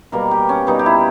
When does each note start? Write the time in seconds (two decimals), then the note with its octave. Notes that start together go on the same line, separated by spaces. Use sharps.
0.12 B2 G3 A#3 A#4
0.31 G4
0.49 C#4
0.67 B2 G3 A#3 D#4
0.79 G4
0.86 E4